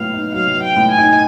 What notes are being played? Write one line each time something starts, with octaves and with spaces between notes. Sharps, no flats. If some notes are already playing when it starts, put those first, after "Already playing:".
Already playing: A2 F#3 B3 F5
D#4
F#3 F5
B3
G5
A2
G#5
D#4